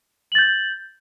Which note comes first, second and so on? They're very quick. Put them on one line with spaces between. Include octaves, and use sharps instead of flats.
F#7 A6 G6